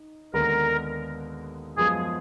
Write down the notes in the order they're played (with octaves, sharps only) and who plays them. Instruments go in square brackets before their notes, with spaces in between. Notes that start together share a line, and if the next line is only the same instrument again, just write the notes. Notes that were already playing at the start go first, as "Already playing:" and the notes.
Already playing: [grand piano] D#4
[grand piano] D#2 D3 G#3 B3 [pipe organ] A#4
[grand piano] F#2 F3 G#3 B3 F4 [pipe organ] G#4